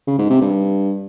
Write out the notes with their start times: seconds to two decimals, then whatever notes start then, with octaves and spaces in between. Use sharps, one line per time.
0.07 C#3
0.19 G#2
0.30 C3
0.41 G2